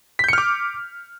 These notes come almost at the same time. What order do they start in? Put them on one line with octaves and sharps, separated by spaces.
B6 G6 C#7 F6 D6